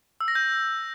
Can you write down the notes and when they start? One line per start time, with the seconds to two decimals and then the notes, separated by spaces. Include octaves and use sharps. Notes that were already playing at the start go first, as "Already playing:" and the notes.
0.21 E6
0.28 A#6
0.35 G6